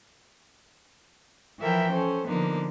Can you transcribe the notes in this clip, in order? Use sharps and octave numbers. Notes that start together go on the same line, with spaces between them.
E3 F3 E4 A#4 E5 G5
C#4 A4 C5
D3 F3 A#3 B3 D#4